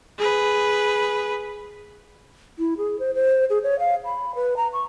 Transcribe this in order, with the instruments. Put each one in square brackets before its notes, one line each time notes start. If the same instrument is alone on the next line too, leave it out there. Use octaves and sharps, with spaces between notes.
[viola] G#4 B4
[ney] E4
G#4
C5
C5
G#4
C#5
F5
B5
B4
A#5
C#6